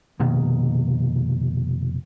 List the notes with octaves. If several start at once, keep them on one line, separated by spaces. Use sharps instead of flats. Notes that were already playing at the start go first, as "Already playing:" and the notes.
F1 B2 D#3 A#3